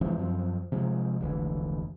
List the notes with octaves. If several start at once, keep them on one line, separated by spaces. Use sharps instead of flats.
E3 F3 G#3 C4
F#2 F3 C4
C3 F3 G#3
F1 C#2 D3 E3